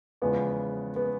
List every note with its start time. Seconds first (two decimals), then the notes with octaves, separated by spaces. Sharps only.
0.22 E2 C#3 F3 G#3 B3
0.96 B3